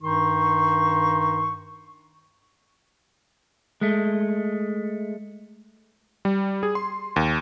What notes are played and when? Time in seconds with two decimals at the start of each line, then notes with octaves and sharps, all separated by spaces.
0.01 G2 D#3 D#4 C6 C#6
3.81 G#3 A3
6.25 G3
6.63 G#4
6.75 C6
7.16 D#2